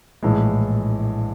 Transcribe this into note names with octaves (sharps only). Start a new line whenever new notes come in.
A#1 A2 E3 G#3